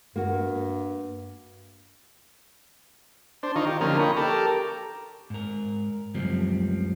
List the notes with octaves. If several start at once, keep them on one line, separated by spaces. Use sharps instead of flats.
G2 A#3 F#4
D4 C5
D#3 D#4 F4 C#6
G4
D3 F3 A#3 C#4 D#4 A#4
D#5 G5 B5 C#6
G4 A4 A#4 D6
G#2 A#4
C#2 F#2 F3 G3 C4